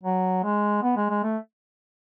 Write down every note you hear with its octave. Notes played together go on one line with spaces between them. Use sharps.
F#3
G#3
B3
G#3
G#3
A3